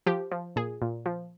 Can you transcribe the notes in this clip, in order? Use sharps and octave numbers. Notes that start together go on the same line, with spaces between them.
F3 G4
F3
A#2 G#4
A#2
F3